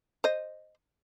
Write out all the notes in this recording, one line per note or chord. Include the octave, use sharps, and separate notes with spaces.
C5 D#5